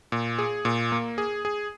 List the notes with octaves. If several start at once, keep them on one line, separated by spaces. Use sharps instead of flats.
A#2
G#4
A#2
A#3
G#4
G#4